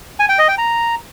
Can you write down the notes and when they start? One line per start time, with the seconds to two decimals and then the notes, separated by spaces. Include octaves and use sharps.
0.19 G#5
0.29 G5
0.39 D#5
0.48 G5
0.58 A#5